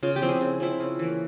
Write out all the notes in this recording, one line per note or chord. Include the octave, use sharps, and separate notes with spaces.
C#3 F4
G4
F3 C4 E4
G#4
C#3
F3 C4 E4
C#3
E3 A#3